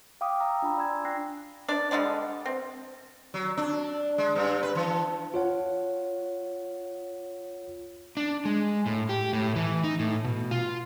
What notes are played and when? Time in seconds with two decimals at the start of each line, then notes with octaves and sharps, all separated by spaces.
0.21 F5 G5 D6 D#6
0.40 F5 G5 A#5 D#6 E6
0.62 D4 F4 G#5 A#5 B5
0.77 D5 C6 E6 G#6
1.05 D4 G5 F#6 A#6 C7
1.68 D4 D5
1.91 D3 G3 G#3 D5
2.46 C4
3.34 F#3
3.57 D4
4.18 G#3
4.35 G2
4.63 B4
4.75 E3
5.34 F4 C#5 F#5
8.17 D4
8.45 G#3
8.86 A2
9.09 G4
9.33 A2
9.56 E3
9.84 D#4
9.99 A2
10.24 B2
10.51 F4